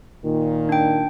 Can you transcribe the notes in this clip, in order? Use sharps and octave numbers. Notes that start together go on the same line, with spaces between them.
A#2 D#3
D4 G5